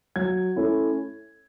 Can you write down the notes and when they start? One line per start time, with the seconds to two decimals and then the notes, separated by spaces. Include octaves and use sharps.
0.16 F#3 G#6
0.56 A3 C#4 E4